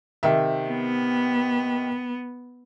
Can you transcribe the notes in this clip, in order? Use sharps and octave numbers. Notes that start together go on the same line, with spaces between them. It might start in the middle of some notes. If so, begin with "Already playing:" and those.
C3 D#3 E5
B3